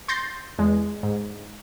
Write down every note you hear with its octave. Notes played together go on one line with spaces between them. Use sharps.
C6 G6 A6 A#6 C7
E2 G#3
G#2